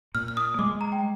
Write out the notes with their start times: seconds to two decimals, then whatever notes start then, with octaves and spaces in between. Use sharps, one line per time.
0.15 A#2 F6
0.28 F6
0.37 D#6
0.59 G#3 D6
0.81 A#5
0.92 G5